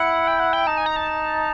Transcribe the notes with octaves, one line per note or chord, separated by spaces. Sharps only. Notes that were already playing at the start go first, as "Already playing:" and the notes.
Already playing: E4 F#5
G5
F#5
G5
D#4 A5
G#5
A#5
A5